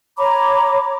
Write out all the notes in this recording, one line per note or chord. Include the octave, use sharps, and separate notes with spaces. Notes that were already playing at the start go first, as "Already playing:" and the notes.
C#5 A#5 B5 D6